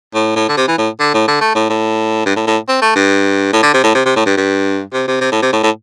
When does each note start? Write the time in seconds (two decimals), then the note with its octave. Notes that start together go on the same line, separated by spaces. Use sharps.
0.15 A2
0.36 A2
0.49 D3
0.57 C3
0.68 E3
0.78 A2
1.00 D3
1.14 A2
1.28 D3
1.41 A3
1.55 A2
1.70 A2
2.26 G2
2.36 A2
2.47 A2
2.69 C4
2.82 A3
2.96 G2
3.53 A2
3.63 D3
3.74 C3
3.84 A2
3.95 C3
4.05 C3
4.16 A2
4.26 G2
4.37 G2
4.94 C3
5.08 C3
5.21 C3
5.32 A2
5.42 C3
5.53 A2
5.63 A2